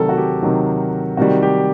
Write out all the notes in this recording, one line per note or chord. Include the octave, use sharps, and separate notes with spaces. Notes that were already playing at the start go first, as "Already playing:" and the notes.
Already playing: C3 D#3 F#3 A4 A#4
F#4
G4
C3 D#3 F#3
C3 D#3 G3 F#4
G4